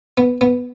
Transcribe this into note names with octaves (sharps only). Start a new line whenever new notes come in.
B3
B3